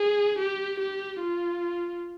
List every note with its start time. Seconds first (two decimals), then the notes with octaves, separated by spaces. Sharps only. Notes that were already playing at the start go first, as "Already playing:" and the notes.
Already playing: G#4
0.38 G4
0.80 G4
1.20 F4